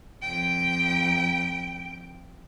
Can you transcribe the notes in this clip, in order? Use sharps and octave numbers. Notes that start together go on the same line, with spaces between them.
F2 G5